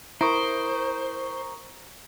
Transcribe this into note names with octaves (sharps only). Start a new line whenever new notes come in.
E4 A#4 C5 A#5 C#6 D#6 D7